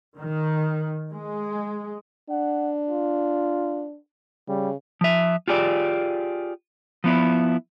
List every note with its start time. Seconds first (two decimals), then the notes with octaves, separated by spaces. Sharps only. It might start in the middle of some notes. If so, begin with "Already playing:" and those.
0.16 D#3
1.09 G#3
2.30 D4 F#5
2.89 F4
4.48 C#3 G3
5.01 F3 E5
5.48 F4 G4 G#4 D5
7.04 F3 B3 E4